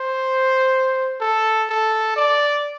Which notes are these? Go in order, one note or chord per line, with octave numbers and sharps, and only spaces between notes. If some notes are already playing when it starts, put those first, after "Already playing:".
Already playing: C5
A4
A4
D5